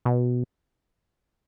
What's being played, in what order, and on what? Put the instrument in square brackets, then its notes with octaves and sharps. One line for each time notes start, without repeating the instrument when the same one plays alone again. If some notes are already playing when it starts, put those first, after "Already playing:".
[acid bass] B2